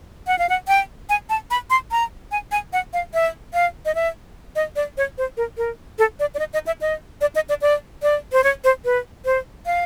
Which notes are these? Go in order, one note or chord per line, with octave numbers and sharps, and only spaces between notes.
F#5
F5
F#5
G5
G#5
A5
B5
C6
A#5
G#5
G#5
F#5
F5
E5
F5
D#5
E5
D#5
D5
C#5
C5
A#4
A#4
A4
D5
D5
D#5
D#5
E5
D#5
D5
D#5
D5
D5
D5
C5
C#5
C5
B4
C5
F5